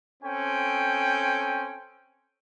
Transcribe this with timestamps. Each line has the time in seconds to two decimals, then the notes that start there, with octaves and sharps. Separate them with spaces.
0.23 C4 C#4 A4 G5